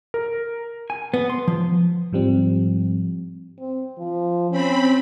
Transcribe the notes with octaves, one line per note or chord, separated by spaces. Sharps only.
A#4
G#5
B3
C6
F3
G#2 F3 G3 C4
C4
F3
C4 C#4 B5